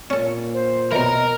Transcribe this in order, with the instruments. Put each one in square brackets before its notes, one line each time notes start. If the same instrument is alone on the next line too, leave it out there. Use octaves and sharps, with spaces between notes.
[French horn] A#2 [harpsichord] C#4 A4
[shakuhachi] C5
[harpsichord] B1 E3 [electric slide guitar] A#4 A#5 [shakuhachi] D#5